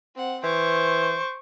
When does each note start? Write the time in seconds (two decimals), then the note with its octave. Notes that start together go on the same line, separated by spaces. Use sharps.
0.15 C4 F#5
0.44 E3 C5 C#6 D6